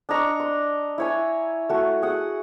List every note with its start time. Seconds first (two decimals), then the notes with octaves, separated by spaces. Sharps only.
0.09 D4 D#5 A#5 C#6
0.40 C6
0.98 E4 C#5 G#5
1.69 A3 F#4
2.02 G#4 F#5